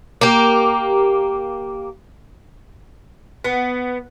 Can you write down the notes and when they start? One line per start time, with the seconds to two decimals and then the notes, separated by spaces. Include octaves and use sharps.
0.21 A#3 G4
3.44 B3